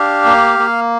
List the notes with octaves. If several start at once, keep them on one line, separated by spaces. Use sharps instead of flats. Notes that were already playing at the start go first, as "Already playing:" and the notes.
Already playing: D4 G4 F5
A#3
A#3